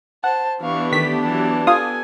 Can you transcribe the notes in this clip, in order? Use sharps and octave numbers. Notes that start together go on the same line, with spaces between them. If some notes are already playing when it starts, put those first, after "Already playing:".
C5 F#5 A5
E3 B3 D4 G4 F5 C#6
D#3 A3 B6
E3 F#3 A5
F4 A4 F5 G#5 D#6